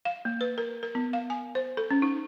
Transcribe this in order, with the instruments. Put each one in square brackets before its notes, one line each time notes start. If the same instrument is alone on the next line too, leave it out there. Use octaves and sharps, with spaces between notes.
[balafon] F5
A#3
B4
A#4
A#4
B3
F5
G#5
C5
A4
C#4
D#4